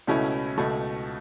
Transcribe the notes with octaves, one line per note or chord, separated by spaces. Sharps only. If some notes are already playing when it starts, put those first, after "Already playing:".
C#2 B2 A3 C#4 E4
C#2 B2 A3